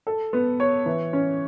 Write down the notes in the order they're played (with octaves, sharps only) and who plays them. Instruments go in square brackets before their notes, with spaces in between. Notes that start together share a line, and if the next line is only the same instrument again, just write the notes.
[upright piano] A4
B3
C#5
E3
C#4